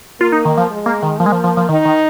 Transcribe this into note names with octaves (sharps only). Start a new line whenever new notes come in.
A#3 F4
D#4
D#3
F3
G#3
A#3
D#3
F3 A#3
G#3
F3
F3
F3
D#3 D#4
D#3